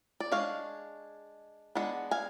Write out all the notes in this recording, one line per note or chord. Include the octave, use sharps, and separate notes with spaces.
D5
G#3 D4 C#5 F5
G#3 B3 D4 F#5
F5 G#5